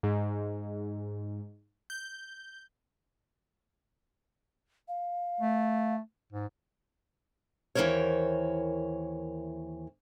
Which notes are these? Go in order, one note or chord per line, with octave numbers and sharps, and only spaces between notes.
G#2
G6
F5
A3
G#2
D#2 E3 D4 A#4 C5 C#5